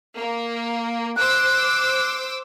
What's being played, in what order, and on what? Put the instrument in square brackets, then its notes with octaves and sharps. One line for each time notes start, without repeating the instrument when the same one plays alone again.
[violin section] A#3
[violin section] C5 D6 E6 [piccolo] F#6